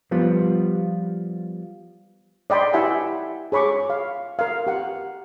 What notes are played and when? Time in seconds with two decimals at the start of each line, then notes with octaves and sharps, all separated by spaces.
0.11 F3 G3 B3 F4
2.50 D5 D#5 G5 B5 C6
2.74 E4 G4 E5 F#5 G#5 B5
3.52 G#4 C#5 B5 C#6 D6
3.90 F5
4.39 A#4 F5
4.67 G4 F#5